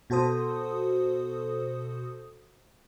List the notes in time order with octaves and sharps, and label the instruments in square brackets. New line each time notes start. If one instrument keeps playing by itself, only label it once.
[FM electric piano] B2 F#4 A4 C5 D#6